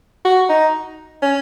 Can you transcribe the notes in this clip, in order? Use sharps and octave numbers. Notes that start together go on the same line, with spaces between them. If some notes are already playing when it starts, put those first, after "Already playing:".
F#4
D#4
C#4